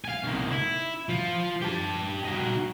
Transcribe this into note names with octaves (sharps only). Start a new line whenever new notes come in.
F5 G#5
C2 D#3
E4
F3 F4
G4 A5
D#4 F#4